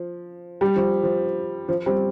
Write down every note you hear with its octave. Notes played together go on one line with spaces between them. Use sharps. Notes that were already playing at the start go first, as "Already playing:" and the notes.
Already playing: F3
G3
F3
F3
F3
G3 C4